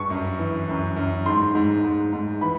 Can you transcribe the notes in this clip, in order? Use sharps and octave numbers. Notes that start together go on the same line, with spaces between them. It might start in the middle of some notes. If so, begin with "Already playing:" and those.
Already playing: G2 C#6
F#2
E3
F#2
F#2
G#2 C6
G#2
G#2
G#2
E3 B5